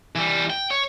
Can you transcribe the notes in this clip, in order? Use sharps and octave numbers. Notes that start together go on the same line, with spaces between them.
E3 G3
G5
C#5